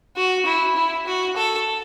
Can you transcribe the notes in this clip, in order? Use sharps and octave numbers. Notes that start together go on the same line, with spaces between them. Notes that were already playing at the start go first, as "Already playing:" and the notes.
F#4
E4
E4
F#4
A4